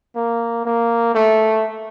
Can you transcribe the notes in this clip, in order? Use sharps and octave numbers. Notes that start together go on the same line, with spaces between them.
A#3
A#3
A3